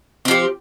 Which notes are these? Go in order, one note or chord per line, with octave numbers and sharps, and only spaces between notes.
F3 C4 G4